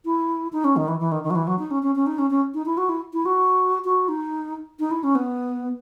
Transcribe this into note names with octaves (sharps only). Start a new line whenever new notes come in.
E4
D#4
C#4
D#3
E3
E3
D#3
D#3
F#3
E3
F#3
D#4
C#4
C#4
C#4
D#4
C#4
C#4
D#4
E4
F#4
E4
E4
F#4
F#4
D#4
D#4
E4
C#4
B3